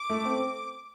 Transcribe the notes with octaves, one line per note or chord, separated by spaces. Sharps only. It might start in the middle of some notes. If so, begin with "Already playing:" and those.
Already playing: D6
A3
C4